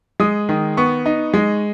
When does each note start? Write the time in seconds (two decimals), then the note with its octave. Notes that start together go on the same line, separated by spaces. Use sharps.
0.20 G#3 D#6
0.49 D#3
0.77 B3 C#6
1.06 D#4
1.34 G#3